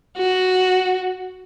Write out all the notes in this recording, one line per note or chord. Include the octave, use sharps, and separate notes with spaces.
F#4